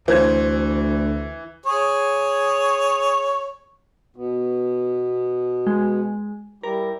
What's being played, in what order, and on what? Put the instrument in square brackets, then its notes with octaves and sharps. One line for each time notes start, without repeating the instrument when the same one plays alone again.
[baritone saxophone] D2 [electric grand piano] E3 [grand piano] C5 G#6
[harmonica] G#4 C#5
[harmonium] B2 B3
[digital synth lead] G#3
[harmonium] G3 E4 G4 [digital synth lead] A#4